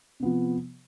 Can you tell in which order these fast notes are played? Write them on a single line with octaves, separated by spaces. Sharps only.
C3 B3 F3